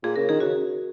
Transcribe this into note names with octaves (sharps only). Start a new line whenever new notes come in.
A#2 G#4
C#3 A#4
D#3 G#4
C#3 F#4